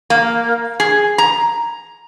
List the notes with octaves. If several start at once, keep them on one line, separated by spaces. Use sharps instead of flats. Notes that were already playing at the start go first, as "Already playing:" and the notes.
A#3
G#4
A#5